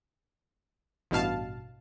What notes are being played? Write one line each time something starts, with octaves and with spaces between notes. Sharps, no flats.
A1 G2 B2 F5 A5